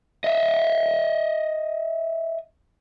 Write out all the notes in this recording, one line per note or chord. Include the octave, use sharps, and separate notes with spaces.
D#5 E5